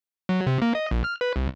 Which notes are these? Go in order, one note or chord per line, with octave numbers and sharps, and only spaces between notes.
F#3
C3
A#3
D#5
A#1
F6
B4
C2